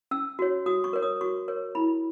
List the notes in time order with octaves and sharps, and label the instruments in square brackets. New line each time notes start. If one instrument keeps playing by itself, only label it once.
[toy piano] C#4 E6
F#4 C#5
F#4 D#6
C#6
A#4 C#5
D#6
F#4 C#6
A#4 C#5
E4 B5